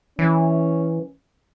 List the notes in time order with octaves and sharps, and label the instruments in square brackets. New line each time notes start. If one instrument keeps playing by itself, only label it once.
[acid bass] E3 [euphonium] C#4